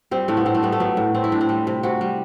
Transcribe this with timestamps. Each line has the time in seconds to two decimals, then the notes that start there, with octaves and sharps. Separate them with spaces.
0.11 G3 C4
0.28 A2 A3
0.37 B3
0.46 A2 C4
0.54 A3
0.63 G3 B3
0.72 A3
0.80 F#3 B3
0.97 A2
1.14 A3 C4
1.24 E4
1.32 A2 D4
1.41 C4
1.49 G3
1.67 C3
1.83 C3 F#4
2.01 G3